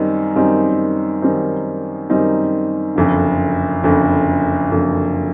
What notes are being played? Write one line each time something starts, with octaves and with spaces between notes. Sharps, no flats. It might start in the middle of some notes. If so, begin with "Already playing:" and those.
Already playing: F#2 D#3 G3 C4 D#4
F#2 D#3 G3 C4 D#4
F#2 D#3 G3 C4 D#4
F#2 D#3 G3 C4 D#4
F#1 F2 D3
F#1 F2 D3
F#1 F2 D3